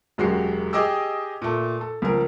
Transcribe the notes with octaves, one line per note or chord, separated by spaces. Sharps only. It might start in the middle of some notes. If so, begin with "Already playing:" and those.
E1 F#2 G#3 F#4 G4 C7
G4 G#4 D#5 G5 D6 E6
A#2 A3
A4
C#2 F3 A#4